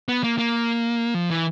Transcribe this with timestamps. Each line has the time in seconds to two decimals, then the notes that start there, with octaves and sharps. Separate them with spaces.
0.08 B3
0.24 A#3
0.39 A#3
1.14 F3
1.30 E3